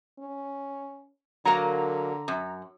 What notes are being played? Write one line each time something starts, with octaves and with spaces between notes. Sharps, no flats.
C#4
D3 F#3 A#3 A#5
F#2